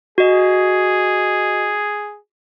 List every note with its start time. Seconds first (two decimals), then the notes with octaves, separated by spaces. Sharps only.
0.18 F#4 G#4 D#5